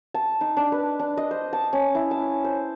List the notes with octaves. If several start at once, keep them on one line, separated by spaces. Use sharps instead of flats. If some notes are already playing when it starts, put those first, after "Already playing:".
A5
D#4
D4
B4
D4
D#5
C5
A5
C#4
E4
A5
C5